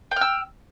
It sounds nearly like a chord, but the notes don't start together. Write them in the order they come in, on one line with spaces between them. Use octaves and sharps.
G5 F6 E6